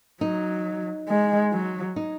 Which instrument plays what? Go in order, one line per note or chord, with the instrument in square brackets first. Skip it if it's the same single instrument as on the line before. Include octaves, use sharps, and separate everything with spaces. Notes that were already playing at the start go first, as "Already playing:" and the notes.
[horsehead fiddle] F#3 [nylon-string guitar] D#4
[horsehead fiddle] G#3
F#3
[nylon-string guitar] D#4